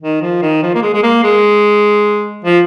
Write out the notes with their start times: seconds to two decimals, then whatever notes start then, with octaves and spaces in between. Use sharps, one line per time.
0.02 D#3
0.21 F3
0.42 D#3
0.63 F3
0.75 A#3
0.82 G#3
0.94 G#3
1.03 A#3
1.24 G#3
2.45 F3